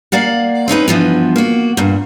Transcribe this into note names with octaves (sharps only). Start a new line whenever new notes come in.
A#3 D5 F5 F#5
C4 C#4 D#4 B4
G2 E3 F3 B3
A#3 F#4
G2 A#2